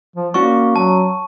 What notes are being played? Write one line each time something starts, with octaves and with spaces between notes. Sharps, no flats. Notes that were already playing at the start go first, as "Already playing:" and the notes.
F3
A#3 C#4 F#4 D5 C#6
F#3 A5